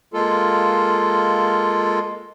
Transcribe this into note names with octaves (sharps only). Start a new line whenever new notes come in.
G#3 A#3 F4 A4